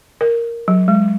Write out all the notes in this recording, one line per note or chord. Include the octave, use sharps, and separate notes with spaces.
A#4
F#3
G#3